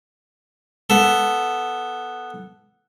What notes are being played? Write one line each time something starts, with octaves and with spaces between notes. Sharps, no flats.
B3 A4